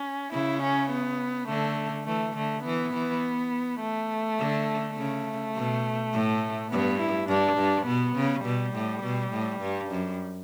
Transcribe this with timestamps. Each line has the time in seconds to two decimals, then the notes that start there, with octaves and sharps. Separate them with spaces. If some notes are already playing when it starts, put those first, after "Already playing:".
Already playing: C#4
0.32 C#3 E4
0.62 C#4
0.91 B3
1.49 D3 A3
2.07 E3 A3
2.36 D3 A3
2.65 E3 B3
2.94 E3
3.80 A3
4.39 D3
4.97 C#3 A3
5.55 B2
6.13 A2
6.71 G2 B3
7.00 E4
7.28 G2 D4
7.57 G2
7.87 B2 B3
8.16 C#3
8.45 B2 G3
8.74 A2
9.03 B2
9.32 A2
9.60 G2
9.90 F#2